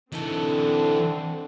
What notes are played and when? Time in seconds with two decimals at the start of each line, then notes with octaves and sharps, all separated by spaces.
0.12 D3 E3 A3 C4 D#4 A4